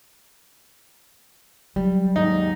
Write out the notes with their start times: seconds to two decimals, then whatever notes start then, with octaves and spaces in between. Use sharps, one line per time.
1.76 F#3 G3
2.16 D#2 G#2 D#4